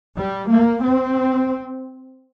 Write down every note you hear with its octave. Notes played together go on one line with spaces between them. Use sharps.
G3
A#3
C4